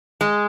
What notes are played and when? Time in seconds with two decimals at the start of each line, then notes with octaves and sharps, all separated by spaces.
0.21 G#3